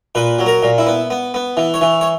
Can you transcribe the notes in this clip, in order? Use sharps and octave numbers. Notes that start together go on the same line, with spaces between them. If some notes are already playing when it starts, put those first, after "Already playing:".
A#2 B4
F#3
A#4
A#2
E4
B3
B3
B3
E3
C#5
E3
C#5